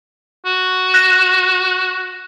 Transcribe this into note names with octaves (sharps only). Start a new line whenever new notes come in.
F#4
F#6 A#6 E7